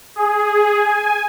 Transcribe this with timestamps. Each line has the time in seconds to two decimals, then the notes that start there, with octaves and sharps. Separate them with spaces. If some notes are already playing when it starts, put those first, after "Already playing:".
0.16 G#4
0.77 G#5